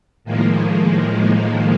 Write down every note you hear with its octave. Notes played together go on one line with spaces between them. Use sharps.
A2 D#3 F3 G#3 A#3